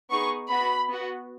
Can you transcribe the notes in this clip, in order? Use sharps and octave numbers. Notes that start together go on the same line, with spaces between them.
B3 D#4 G#4 C#6
B3 F#4 B5
B3 F#4